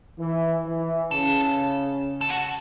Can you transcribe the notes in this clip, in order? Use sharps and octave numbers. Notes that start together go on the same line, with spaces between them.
E3
E3
C#3 A4
A4
F#4